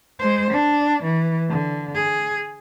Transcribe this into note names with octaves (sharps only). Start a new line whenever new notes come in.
G#3 C5
D4
E3
D3
G#4